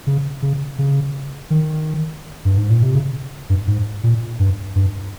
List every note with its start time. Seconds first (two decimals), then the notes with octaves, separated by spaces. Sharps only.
0.07 C#3
0.42 C#3
0.78 C#3
1.50 D#3
2.45 G2
2.58 G#2
2.70 A#2
2.83 C3
2.95 C#3
3.50 G2
3.67 G#2
4.03 A#2
4.39 G2
4.75 G2